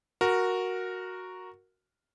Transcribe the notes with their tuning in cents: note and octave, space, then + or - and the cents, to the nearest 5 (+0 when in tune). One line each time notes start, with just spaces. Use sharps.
F#4 -5 A#4 +0